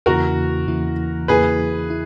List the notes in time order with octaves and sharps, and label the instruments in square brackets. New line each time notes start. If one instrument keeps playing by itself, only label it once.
[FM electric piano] E2 C#3 E3 A#3 E4 [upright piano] F#4 A#4
[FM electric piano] E2 C#3 E3 A#3 E4
[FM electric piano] E2 C#3 E3 A#3 E4 [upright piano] G#4 B4
[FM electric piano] E4